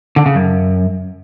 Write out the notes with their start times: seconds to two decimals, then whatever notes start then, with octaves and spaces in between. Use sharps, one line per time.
0.16 D3
0.26 C#3
0.35 F#2